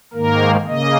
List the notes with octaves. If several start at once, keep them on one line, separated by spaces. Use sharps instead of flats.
G#2 D#3 A#3 A#4
C#3 A#3 D#5